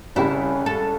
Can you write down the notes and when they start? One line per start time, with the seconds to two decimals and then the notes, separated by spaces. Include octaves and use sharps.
0.16 C2 C#3 C#4 E4 G4
0.66 A4